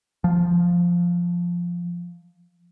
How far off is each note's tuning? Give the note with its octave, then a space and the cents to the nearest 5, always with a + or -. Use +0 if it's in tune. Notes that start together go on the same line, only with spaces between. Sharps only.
F3 +0